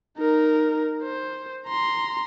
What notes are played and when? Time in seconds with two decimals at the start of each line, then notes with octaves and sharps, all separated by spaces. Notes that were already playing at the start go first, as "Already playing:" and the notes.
0.18 D#4 A#4
1.03 C5
1.67 A#5 C6